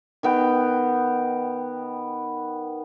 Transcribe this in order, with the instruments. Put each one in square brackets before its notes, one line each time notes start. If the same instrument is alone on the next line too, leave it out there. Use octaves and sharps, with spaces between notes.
[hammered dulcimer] D#3 B3 G5